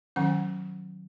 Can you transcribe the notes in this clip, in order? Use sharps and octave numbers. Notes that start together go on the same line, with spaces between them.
D#3 F#3 C#4 F#5